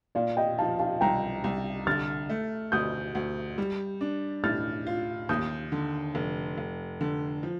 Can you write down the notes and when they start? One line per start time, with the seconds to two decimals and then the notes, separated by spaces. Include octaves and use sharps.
0.15 A#2 D5 F5
0.37 D#5 G5
0.58 F3 F5 A5
0.79 F5 A5
1.01 C2 G5 A#5
1.44 C2
1.87 D3 F6 A6
2.30 A3
2.72 D2 D#6 G6
3.15 D2
3.58 G3
4.01 D4
4.44 A2 F6 A6
4.87 F4
5.29 D#2 D#6 G6
5.72 D3
6.15 F1
6.58 F1
7.01 D3
7.43 F3